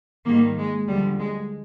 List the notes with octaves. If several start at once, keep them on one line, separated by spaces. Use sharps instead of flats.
G#2 D#3 G3 A#3
G#3
D2 D3 F3 G3
G#3